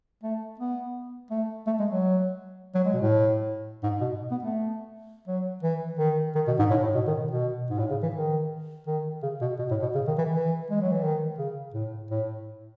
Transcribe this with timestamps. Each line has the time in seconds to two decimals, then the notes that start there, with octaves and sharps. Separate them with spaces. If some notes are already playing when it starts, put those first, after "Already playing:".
0.23 A3
0.59 B3
1.31 A3
1.67 A3
1.80 G#3
1.91 F#3
2.75 F#3
2.85 G#3
2.93 B2
3.02 A2
3.83 G#2
4.01 B2
4.31 B3
4.43 A3
5.28 F#3
5.63 E3
5.99 D#3
6.35 D#3
6.47 B2
6.59 G#2
6.71 A2
6.83 A2
6.94 B2
7.07 D#3
7.31 B2
7.70 G#2
7.79 A2
7.91 C#3
8.03 E3
8.14 D#3
8.87 D#3
9.23 C#3
9.41 B2
9.59 B2
9.71 A2
9.82 B2
9.95 C#3
10.07 D#3
10.18 E3
10.31 E3
10.70 G#3
10.82 F#3
10.92 E3
11.03 D#3
11.38 C#3
11.74 A2
12.11 A2